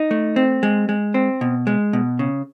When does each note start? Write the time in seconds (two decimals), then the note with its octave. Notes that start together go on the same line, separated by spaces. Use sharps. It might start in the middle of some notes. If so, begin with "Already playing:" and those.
Already playing: D#4
0.11 A3
0.36 C4
0.63 G#3
0.89 G#3
1.14 C4
1.41 B2
1.67 G#3
1.93 B2
2.19 C#3